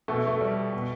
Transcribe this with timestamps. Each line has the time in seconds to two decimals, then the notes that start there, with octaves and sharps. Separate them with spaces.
0.08 B2 A3
0.27 A3
0.41 G3
0.73 B2